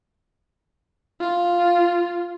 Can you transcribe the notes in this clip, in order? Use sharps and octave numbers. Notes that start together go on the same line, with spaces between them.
F4